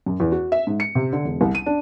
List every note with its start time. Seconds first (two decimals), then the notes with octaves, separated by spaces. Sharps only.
0.06 F#2
0.20 E2
0.32 F#4
0.52 E5
0.67 G#2
0.80 C#7
0.95 C3
1.13 D3
1.25 E1
1.41 C2
1.55 D#7
1.66 D4